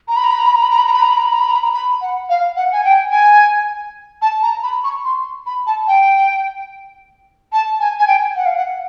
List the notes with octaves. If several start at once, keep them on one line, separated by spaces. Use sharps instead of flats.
A#5
B5
A#5
B5
A#5
B5
A#5
B5
A#5
B5
A#5
B5
A#5
B5
A#5
B5
A#5
B5
A#5
B5
A#5
B5
F#5
F5
F#5
G#5
G5
G#5
A5
A#5
B5
C#6
C6
B5
A5
G5
A5
G#5
G#5
G5
F#5
F5
F#5